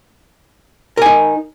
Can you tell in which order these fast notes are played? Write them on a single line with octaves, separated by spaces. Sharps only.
A#4 G#5 D#4